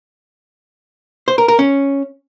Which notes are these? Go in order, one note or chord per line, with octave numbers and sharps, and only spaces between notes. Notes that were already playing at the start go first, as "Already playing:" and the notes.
C5
A#4
A#4
C#4